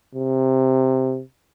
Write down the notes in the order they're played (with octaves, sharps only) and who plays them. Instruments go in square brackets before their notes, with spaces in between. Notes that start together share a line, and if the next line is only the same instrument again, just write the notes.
[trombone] C3